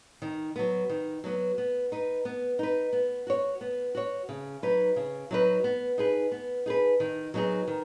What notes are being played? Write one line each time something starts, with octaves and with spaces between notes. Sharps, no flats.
D#3
F#3 B3
D#3
F#3 B3
B3
D#4 B4
B3
D#4 B4
B3
F#4 C#5
B3
F#4 C#5
C#3
F#3 D#4 B4
C#3
F#3 D#4 B4
B3
D#4 G#4 B4
B3
D#4 G#4 B4
D#3
F#3 B3 D#4 G#4
D#3